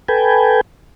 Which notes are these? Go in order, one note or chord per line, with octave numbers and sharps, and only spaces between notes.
A4 B4 G5 G#5